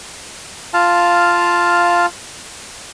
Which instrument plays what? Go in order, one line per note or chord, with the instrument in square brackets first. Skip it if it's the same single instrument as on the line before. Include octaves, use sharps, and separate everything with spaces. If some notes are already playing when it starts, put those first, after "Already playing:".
[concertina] F4 F5 A5